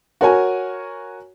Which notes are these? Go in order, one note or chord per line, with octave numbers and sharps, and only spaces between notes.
F#4 A#4 C#5 G#5